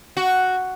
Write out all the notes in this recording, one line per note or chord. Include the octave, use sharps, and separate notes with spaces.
F#4